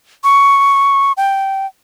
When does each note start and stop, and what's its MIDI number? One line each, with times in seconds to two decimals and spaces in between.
0.24 1.12 85
1.17 1.66 79